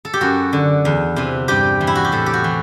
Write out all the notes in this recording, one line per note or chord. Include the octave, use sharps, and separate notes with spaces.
A4
G4
F#2 F#4
D3
E2
C3 E3
G2 G4
E3
E4
F#4
G4
A2 A4
G4
F#4
E3